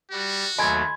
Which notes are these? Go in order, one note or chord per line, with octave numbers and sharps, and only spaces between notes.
G3 F#4
D#2 F#3 A3 D#5 G#5 B5 C6 G#6